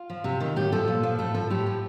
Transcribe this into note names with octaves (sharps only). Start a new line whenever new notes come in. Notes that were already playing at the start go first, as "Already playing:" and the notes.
Already playing: F4
F3
C3
D#3
A2 G4
F3 A4
A#2
F3
A2 A4
F3 A4
A2 G4
F3